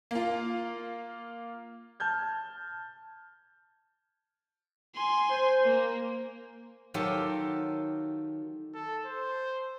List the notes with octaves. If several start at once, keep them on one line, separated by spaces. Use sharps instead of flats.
A#3 F4
A5 F6 G6 G#6
G#5 C6
C5
A#3
D#3 F#3 F4 G4 A4
A4
C5